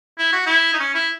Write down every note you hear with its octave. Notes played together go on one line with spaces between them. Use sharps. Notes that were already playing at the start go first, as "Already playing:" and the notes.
E4
F#4
E4
D#4
C#4
E4